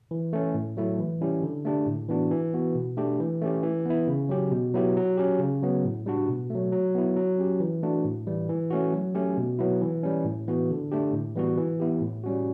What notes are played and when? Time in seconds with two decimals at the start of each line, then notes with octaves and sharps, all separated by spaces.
0.11 E3
0.33 A3 C#4
0.54 A2
0.77 F#3 A3 E4
0.99 E3
1.21 G3 C#4 E4 G4
1.43 D3
1.65 A3 D4 G4
1.87 A2
2.09 E3 B3 D4 F#4
2.31 E3
2.54 B3 F#4
2.75 B2
2.97 A3 D4 G4
3.20 E3
3.42 A3 C#4 G4
3.63 E3
3.85 B3 E4
4.07 C#3
4.29 F#3 C#4 G4
4.52 B2
4.74 F#3 B3 E4 G4
4.97 F#3
5.17 C#4 G4
5.39 C#3
5.63 F#3 B3
5.84 A2
6.06 G3 D4 F#4
6.28 B2
6.50 F#3 A3
6.72 F#3
6.95 B3 E4
7.16 F#3
7.39 C#4 G4
7.60 E3
7.82 A3 D4 F#4
8.04 A2
8.27 E3 G3
8.49 E3
8.70 A3 C#4 F#4
8.93 F#3
9.15 A3 C#4 G4
9.37 B2
9.59 F#3 B3 E4
9.82 E3
10.03 G3 C#4
10.25 A2
10.48 E3 B3 F#4
10.70 D3
10.92 A3 D4 G4
11.13 A2
11.36 E3 G3 B3 F#4
11.57 E3
11.80 B3 E4 G4
12.01 A2
12.24 G3 C#4 F#4